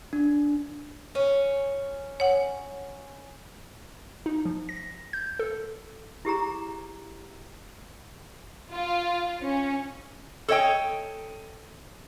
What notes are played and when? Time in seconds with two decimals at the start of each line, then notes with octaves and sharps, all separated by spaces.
0.13 D4
1.15 C#4
2.20 C#5 F#5
4.26 D#4
4.45 F3
4.69 A#6
5.13 G6
5.39 A4
6.25 E4 G4 G#4 A#5
8.72 F4
9.43 C#4
10.48 A4 C#5 D#5 G5